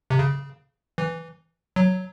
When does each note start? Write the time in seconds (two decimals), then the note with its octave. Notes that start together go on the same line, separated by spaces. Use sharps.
0.10 C3
0.19 C#3
0.98 E3
1.76 F#3